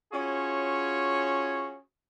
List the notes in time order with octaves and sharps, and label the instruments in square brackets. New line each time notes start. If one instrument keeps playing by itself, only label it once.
[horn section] C#4 F4 F#4 G#4 C#5